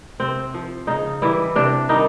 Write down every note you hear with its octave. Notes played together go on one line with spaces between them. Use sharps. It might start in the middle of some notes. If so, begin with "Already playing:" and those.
C3 C4
F3
C#3 D#4
E3 G3 E4
C3 D4
D#3 G3 D#4